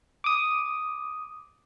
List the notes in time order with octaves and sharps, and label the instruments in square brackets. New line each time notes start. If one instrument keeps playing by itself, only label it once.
[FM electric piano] D6 D#6